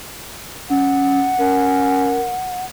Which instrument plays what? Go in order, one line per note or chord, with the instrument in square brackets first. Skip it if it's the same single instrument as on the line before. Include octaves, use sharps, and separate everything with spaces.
[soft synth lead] C#4 [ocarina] F#5
[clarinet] C#4 [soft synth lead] A#4